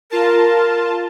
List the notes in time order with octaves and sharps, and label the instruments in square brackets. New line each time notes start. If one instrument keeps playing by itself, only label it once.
[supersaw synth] F4 A5 [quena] A#4